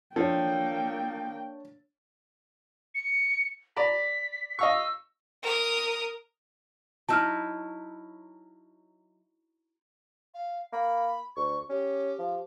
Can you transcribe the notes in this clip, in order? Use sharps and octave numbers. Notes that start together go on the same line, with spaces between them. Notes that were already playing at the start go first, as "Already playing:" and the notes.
F3 A#3 D4 A4 C#5 G5
C#7
D5 A#5 B5 B6
D#5 F5 C#6 E6
A#4 D#6
F#3 D#4 E4 A5 E6 F6
F5
A#3 B5
D2 C#6
C#4 G4
F3